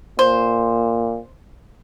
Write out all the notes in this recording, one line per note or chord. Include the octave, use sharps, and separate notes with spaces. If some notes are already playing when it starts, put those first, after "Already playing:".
A#2 C5